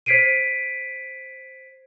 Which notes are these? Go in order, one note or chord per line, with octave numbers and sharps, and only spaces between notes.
C5 G#6 B6 C7 D7 D#7